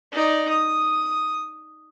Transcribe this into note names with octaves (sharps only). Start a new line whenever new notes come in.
D#4 D5
D#6